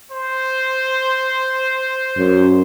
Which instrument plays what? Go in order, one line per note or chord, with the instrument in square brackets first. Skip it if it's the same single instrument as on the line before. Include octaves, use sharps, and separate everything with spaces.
[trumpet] C5
[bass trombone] F#2